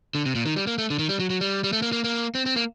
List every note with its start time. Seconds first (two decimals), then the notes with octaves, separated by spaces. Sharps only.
0.15 D3
0.26 C3
0.35 A#2
0.46 D#3
0.56 G3
0.67 A#3
0.78 A3
0.90 D3
0.99 D#3
1.09 G3
1.20 F#3
1.30 F#3
1.41 G3
1.64 G3
1.73 A3
1.82 A#3
1.93 A#3
2.04 A#3
2.35 C4
2.46 C4
2.56 A#3